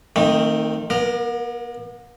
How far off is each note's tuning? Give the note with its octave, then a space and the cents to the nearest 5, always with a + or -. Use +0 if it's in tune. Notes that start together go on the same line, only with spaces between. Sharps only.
D#3 +0 A3 +40 C4 +25
B3 -45 A#4 +0